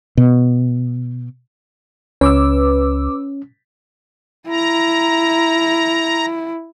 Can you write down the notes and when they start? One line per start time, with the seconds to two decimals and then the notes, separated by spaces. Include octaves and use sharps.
0.17 B2
2.21 C#2 C#4 B4 D6 E6
4.49 E4 A#5